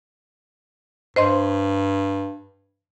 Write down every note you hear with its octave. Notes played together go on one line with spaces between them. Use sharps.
G2 C5 D#5 C6